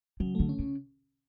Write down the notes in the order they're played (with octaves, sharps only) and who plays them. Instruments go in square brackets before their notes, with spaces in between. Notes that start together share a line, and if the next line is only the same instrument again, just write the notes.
[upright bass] C#3 [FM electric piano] F#3
[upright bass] D3 [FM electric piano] A3
[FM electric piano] C#4
[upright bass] C#3